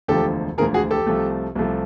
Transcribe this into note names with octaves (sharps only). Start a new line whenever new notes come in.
E1 D2 D3 F3 G4 A4
E1 D2 D3 F3 G#4 A#4
F#4 G#4
G4 A4
C2 C3 F3 A3
C2 C3 F3 A3